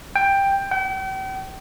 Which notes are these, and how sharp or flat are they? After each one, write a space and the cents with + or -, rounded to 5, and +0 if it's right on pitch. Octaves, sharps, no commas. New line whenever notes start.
G5 +10
G5 -40